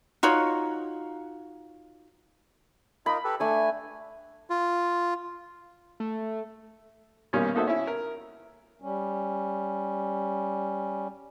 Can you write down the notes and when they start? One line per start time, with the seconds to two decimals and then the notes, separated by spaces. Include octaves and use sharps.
0.23 D#4 F4 F#4 C#5
3.06 D#4 F4 A#4 B5
3.24 G4 A4 B4
3.40 A3 D4 G#5
4.50 F4
6.00 A3
7.33 B1 D#3 G3 A#3 C#4
7.55 A#3 D#4 F#4 A4 C5 E5
7.67 C#4 E4
7.87 A#4
8.82 G3 C#4